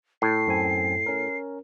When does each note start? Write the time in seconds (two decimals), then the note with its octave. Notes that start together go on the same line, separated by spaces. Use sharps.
0.22 A2 C7
0.47 F#2 C4 G#5
1.06 C#4 A#4